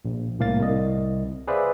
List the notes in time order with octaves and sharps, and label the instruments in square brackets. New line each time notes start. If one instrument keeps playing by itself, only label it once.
[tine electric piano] A#1
C2 A2 A#3 F5 A6
C2 D#5
G#4 B4 C5 D5 E5 F5